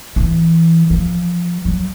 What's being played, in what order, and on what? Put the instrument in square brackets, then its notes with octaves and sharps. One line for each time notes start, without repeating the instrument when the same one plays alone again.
[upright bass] E3
F3
F#3